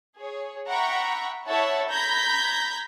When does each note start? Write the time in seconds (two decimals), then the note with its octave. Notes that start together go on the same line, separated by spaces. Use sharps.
0.17 G#4 C#5
0.69 E5 F#5 G5 A#5 B5 C#6
1.47 E4 A4 C#5 E5 F#5 A5
1.88 A#5 B5 G6 G#6 A#6 B6